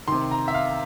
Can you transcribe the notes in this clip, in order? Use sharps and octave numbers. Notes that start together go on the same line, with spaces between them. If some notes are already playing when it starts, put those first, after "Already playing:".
C3 D#3 C6
A#5
E5
F5